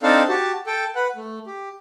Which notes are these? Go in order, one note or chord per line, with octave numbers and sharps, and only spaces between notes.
C4 D4 D#4 A4 C5 F5
F#4 G4 A5
A4 G5
B4 F#5
A3
G4